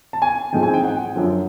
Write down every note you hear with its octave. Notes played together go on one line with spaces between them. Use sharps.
A5
G#5
A1 G#2 F3 G#3 C4 G5
G#5
G5
F#5
F#2 D3 F3